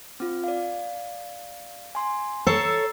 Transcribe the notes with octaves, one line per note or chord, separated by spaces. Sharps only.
C4 F4
D5 F5
G#5 C6
A4 C#5 A#5 E6 C7